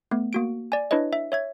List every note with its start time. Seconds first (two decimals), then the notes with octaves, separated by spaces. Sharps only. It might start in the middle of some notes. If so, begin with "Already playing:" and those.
0.11 A3 B3
0.33 A#3 F#4 D7
0.72 D5 G#5
0.91 D4 E4 B4 C#5 D#5
1.13 E5
1.32 C#5 E5 G#6